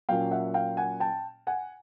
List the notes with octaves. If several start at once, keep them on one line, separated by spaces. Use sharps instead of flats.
A#2 F#3 A#3 C#4 F5 G5
E5 F#5
F5 G5
F#5 G#5
G5 A5
F#5 G#5